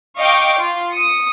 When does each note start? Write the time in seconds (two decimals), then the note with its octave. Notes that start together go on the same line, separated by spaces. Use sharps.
0.18 D#5 F5 G5 C#6 D6
0.60 F4
0.93 D#6 C#7